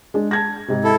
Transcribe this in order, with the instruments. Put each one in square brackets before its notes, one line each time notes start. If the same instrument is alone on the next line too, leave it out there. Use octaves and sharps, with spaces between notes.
[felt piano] G#3 D4
A5 G#6 A#6
G#2 C3
[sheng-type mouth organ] E4 A4